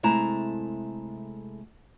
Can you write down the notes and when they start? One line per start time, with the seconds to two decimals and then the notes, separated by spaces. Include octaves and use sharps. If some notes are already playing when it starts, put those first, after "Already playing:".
0.03 C3 G#3 A3 E4 A5 A#5